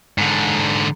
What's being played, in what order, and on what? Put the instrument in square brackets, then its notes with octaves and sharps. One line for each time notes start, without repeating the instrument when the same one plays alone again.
[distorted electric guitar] G#2 D3